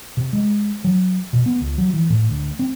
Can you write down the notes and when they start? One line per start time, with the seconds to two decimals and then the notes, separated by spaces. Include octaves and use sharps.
0.17 C3
0.33 G#3
0.84 F#3
1.33 B2
1.46 B3
1.60 C#2
1.78 F#3
1.93 E3
2.10 A2
2.29 D2
2.59 C4